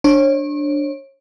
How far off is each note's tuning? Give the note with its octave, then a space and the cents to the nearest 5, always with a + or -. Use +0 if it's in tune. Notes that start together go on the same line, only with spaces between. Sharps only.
D4 +0 C#5 -35